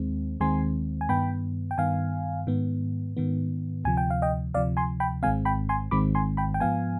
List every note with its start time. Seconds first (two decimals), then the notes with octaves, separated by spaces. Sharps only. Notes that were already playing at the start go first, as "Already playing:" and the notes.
Already playing: D#2 D#3 G#3 C4
0.40 D#2 D#3 G#3 C4 G#5 C6
1.01 G#5
1.09 G2 D#3 B3 G5 B5
1.71 G5
1.78 G2 D#3 B3 F5 G#5
2.47 G#2 D#3 B3
3.17 G#2 D#3 B3
3.85 D2 C3 F3 G#5
3.97 G5
4.10 F5
4.22 D#5 G5
4.54 D2 C3 F3 D5 F5
4.77 G#5 C6
5.00 G5 B5
5.22 G#1 G#2 D#3 G#3 C4 F5 G#5
5.45 G5 B5
5.69 G#5 C6
5.91 G#1 G#2 D#3 G#3 C4 B5 D6
6.15 G#5 C6
6.37 G5 B5
6.54 G5
6.60 G#2 F3 B3 F5 G#5